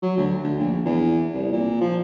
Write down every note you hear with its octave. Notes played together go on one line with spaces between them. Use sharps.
F#3
D2
D2
A#1
E2
C2
A#2
F3